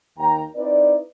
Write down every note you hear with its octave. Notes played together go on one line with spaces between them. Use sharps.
D#2 G5 A#5
C4 D#4 E4 B4 D5